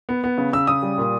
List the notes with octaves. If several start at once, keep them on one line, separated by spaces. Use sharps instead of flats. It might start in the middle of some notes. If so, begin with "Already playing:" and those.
B3
B3
C#3
C#3 E6
C#3 D#6
G3
A#2